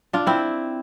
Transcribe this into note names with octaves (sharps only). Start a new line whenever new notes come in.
D4 F4
C4 E4